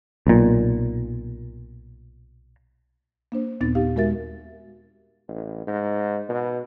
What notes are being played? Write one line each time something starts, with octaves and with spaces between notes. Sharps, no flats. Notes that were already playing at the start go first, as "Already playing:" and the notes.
B1 A#2
A#3 D4 C5
D#2 A#2 B3 C4 D#4 A6
D#4 G4 F5
G#3 F#4 A#4 E5 A6
A1
G#2
B2